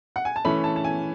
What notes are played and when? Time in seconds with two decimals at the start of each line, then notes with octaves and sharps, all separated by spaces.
0.16 F#5
0.25 G#5
0.36 A5
0.45 E3 A3 C#4 B5
0.64 A5
0.76 A5
0.84 G#5